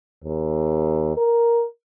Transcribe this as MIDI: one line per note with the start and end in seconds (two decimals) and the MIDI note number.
0.24 1.16 39
1.17 1.65 70